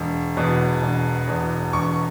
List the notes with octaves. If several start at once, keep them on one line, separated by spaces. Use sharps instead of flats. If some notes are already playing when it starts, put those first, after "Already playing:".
Already playing: E1
E2 B2
E1
E2 B2
E1 C#6